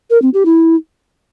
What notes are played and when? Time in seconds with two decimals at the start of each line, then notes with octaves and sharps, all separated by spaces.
0.10 A#4
0.22 C4
0.34 G4
0.45 E4